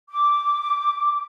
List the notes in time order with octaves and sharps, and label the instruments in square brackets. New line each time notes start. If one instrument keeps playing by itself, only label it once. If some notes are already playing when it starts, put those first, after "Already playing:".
[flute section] D6